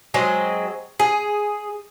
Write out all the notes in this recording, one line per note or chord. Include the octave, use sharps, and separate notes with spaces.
F#3 G#3 C4 D#5
G#4